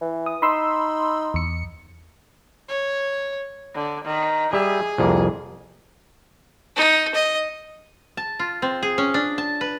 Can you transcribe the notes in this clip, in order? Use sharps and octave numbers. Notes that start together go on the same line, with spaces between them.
E3
D#6
D#4 B5 C6 E6
E2 C#7
C#5
D3
D#3
G3 G#4 E5
C2 F2 A#3
D#4
D#5
A5
F4
C4
G#4
C#4
D4
A5
B4